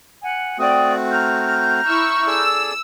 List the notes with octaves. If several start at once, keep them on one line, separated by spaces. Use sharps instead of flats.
F#5 G#5
A3 C4 F#4 D5 G5 D#6
A#5 F6 G6
E4 C#6 E6
G#4 A4 D5 E6